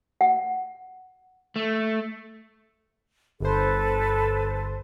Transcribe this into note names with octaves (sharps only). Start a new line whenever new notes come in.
F#5
A3
G1 A4 B4 C5